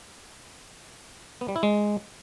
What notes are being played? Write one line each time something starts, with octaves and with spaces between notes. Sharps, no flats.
B3
G3
E4
G#3